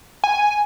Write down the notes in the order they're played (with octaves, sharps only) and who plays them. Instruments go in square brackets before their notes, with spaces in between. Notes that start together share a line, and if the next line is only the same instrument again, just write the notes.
[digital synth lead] G#5